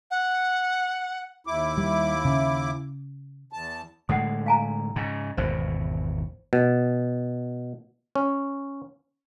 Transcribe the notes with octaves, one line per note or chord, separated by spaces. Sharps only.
F#5
D#2 E4 D6
G3
C#3
E2 A5
A2 D3 G#3 F#5 D#6
F5 G#5 A#5
G#2 C#3
G#1 E2 B2 C5
B2
C#4